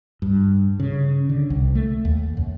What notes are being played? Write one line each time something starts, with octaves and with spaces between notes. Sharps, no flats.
G2
C#3
D3
C2
A3
D#2
F#2